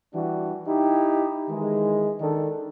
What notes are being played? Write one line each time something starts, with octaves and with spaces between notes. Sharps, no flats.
E3 G3 D4 F#4
D#4 E4 G4
D#3 E3 G#3
D#3 D4 A4